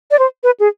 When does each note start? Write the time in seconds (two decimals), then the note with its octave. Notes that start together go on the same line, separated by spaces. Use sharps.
0.11 D5
0.19 C5
0.43 B4
0.60 G#4